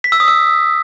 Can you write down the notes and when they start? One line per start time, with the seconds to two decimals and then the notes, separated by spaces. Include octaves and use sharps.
0.04 B6
0.12 E6
0.20 D#6
0.28 E6